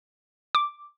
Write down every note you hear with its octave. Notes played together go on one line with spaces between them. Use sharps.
D6